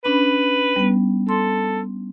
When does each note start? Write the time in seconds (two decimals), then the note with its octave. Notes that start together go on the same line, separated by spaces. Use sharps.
0.05 C#4 D4 B4 B5
0.76 G3 B3
1.29 A4 C6